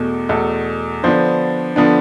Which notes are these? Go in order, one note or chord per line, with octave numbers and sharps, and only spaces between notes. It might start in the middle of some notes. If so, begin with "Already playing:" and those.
Already playing: E2 B2 A3
E2 B2 A3 A4
D3 F3 B3 D4 C5
D3 F3 B3 D4